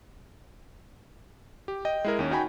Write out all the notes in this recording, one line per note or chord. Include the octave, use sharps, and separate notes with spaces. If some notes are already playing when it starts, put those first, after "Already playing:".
G4
D#5 G5
G#3 E4 A#4
D#2 C#4
D#4 F#4 D#5 G5 G#5 B5